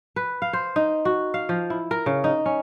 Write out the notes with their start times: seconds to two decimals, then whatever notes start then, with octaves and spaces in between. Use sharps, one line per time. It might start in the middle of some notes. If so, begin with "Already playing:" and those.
0.16 B4
0.42 F5
0.53 C5
0.76 D#4
1.05 F#4
1.34 F5
1.49 F3
1.70 E4
1.91 A#4
2.06 C#3
2.24 D#4
2.46 C#4